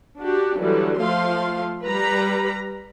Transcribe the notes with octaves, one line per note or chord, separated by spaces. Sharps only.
D4 F#4 G4
D3 E3 F#3 G3
F3 A3 F5 C6
G3 B4 A#5 B5